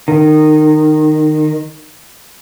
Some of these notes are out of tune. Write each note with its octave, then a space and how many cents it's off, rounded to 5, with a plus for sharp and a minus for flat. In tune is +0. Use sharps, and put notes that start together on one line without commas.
D#3 -20